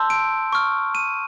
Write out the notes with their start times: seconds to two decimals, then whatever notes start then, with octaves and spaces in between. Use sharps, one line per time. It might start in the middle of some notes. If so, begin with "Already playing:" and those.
Already playing: A5 C6 E6 G6
0.10 D7
0.52 C#6 F6
0.95 D#7